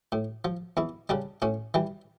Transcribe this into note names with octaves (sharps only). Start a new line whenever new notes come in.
A2
F3
E2 E4
C#3 G3 D4
A2 C#4
E3 G3